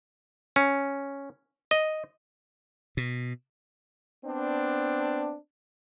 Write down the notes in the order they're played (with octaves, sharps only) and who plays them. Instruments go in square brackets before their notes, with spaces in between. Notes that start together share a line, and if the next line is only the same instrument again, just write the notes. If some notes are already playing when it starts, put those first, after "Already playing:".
[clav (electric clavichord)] C#4
D#5
[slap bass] B2
[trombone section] B3 C4 D4